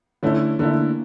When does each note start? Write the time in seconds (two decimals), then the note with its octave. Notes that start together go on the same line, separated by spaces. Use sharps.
0.23 D3 A3 C#4 E4
0.59 D3 A3 A#3 D4 E4